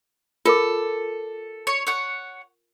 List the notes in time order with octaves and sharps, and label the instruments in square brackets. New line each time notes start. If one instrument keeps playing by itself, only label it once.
[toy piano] F4 A#4 D6 [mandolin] A4
[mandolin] C#5
C#5 F#5